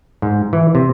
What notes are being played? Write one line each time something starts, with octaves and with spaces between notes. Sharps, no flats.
G#2
E3
C3